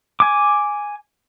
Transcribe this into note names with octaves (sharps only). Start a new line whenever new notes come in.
G#5 D6